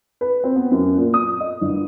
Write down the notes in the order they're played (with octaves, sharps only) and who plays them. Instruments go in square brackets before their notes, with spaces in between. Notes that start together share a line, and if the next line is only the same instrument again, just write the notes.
[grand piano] B4
C4
B3
F#2
A#2
D#6
D#5
G1